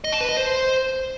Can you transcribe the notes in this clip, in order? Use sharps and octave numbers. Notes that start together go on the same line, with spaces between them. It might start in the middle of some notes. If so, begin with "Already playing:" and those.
D#5
A5
B4
D#5
C5